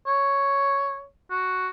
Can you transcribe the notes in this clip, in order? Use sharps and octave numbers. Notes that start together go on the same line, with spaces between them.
C#5
F#4